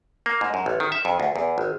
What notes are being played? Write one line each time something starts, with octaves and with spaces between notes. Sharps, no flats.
A#3
G#2
F#2
A1
D#3
E5
F2
D2
E2
G#1